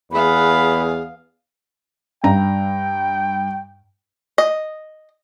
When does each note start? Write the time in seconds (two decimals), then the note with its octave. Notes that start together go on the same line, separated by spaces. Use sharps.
0.12 E2 B3 G#4 F5 B5
2.24 G2 G5 A#5
4.38 D#5